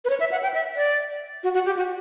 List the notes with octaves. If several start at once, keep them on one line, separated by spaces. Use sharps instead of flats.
B4
C#5
E5
F#5
G5
E5
D5
F#4
F#4
G4
F#4